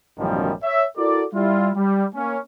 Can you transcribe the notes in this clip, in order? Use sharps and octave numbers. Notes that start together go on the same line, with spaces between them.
A1 F#2 B2 D#3 F3 G3
C#5 E5
E4 F#4 A4 A#4 D5
G3 E4 F4
G3
A#3 C#4